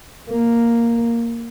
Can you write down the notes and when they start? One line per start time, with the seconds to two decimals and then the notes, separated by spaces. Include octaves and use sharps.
0.30 A#3